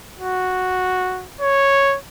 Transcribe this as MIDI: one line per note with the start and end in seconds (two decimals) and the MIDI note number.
0.19 1.28 66
1.41 1.97 73